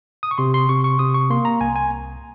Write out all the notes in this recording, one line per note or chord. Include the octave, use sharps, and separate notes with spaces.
D#6
C#6
C3 C6
C6
C3 C#6
C#6
C3 D#6
C#6
A#3 C6
A#5
C2 G#5
G#5